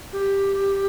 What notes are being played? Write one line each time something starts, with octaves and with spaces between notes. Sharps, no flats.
G4